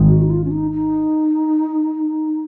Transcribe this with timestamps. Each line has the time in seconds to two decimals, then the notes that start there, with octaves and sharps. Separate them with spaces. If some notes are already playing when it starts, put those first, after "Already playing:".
Already playing: G#1 G#2 D#3
0.08 F#4
0.22 D#4
0.30 F4
0.44 C#4
0.51 D#4
0.72 D#4